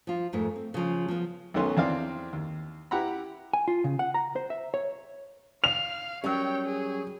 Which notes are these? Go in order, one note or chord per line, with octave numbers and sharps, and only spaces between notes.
F3 F4
F2 G#2 A3 A#4
C4
C#3 F3
F3 B3
B1 D#3 A3 B3 C#4 C6
E2 C4 D4 F5 C6
D#2
E4 G4 F#5 A#5 B5
G#5
F4
C#3
F#5
A#5
C5
E5
C#5
F5 F7
F#3 G3 C#4 A#4 C#5 G5
G#4